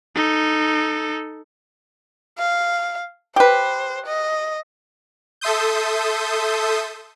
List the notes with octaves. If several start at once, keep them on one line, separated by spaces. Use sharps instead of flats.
D#4 A4
F5
G4 B4 C5
D#5
A4 E5 C6 D#6 G6